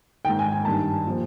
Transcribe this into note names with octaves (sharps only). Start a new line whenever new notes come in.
G#2 D#3 G5
G#5
G#5
G2 D#3 A5
A#2 F3